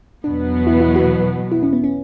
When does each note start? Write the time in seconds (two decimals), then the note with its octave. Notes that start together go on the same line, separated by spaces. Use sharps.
0.24 E2 B2 F#3 B3 D4
0.67 E4
0.80 E4
0.96 F#4
1.52 E4
1.63 C#4
1.73 B3
1.84 C#4